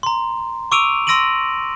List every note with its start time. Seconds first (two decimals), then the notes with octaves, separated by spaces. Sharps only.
0.03 A#5 C6
0.72 C#6 D6 E6 D7 D#7 F7
1.07 C6 E6 A#6 D7 D#7 F#7